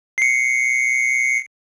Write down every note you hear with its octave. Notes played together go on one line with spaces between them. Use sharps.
C7 C#7